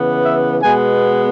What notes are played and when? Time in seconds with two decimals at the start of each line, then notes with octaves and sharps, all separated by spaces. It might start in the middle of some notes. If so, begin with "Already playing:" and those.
Already playing: C#3 E3 B3
0.24 E5
0.62 B2 G#3 B3 G#5